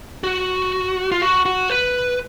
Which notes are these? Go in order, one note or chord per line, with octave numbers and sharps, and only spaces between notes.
F#4
F4
F#4
F#4
B4